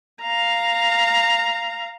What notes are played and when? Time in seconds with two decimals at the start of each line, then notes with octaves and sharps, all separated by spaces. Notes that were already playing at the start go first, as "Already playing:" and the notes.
0.22 F5 A#5